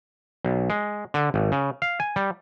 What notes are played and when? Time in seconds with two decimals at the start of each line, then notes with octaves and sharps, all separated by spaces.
0.45 B1
0.70 G#3
1.14 D3
1.34 G#1
1.52 C#3
1.82 F5
2.00 G#5
2.16 G3